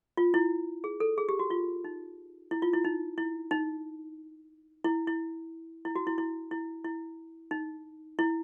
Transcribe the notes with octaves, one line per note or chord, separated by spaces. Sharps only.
F4
E4
G#4
A4
G#4
G4
F#4
F4
D#4
E4
F4
E4
D#4
E4
D#4
E4
E4
E4
F#4
E4
E4
E4
E4
D#4
E4